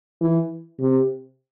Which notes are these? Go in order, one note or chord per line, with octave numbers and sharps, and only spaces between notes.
E3
C3